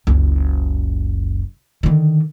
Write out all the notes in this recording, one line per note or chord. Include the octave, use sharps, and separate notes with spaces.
F#1 C#2
D3 D#3